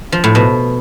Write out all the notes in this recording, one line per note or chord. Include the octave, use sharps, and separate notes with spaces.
F3
A2
B2